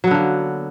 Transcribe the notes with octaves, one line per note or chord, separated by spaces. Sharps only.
D3 F#3 A#3 B3